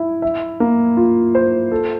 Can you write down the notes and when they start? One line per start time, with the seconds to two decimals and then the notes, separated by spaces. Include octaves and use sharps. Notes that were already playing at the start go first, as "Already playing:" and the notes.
Already playing: E4
0.22 E5
0.60 A#3
0.97 F4
1.35 C5
1.72 A4